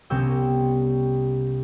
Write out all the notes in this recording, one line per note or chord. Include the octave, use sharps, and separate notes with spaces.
C2 C3 B3 C#4 G5 E6